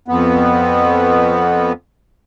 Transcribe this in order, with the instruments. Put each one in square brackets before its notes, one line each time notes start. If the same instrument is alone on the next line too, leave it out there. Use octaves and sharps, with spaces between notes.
[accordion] F2 B3